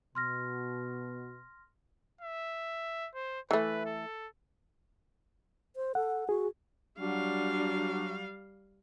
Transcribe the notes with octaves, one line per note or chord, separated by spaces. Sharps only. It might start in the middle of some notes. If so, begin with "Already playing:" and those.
B2 C6 F6 A#6
E5
C5
E3 A3 B4
A4
C5
A4 F#5
F#4 G#4
F#3 G3 D4 F#4 F5